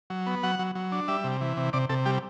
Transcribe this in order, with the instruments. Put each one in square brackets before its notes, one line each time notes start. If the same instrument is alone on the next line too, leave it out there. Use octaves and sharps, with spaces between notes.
[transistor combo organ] F#3
B3
F#3 F#5
F#3
F#3
D4
G3 E5
C3
E3
C3
C3 D5
C3 A4
G3 G4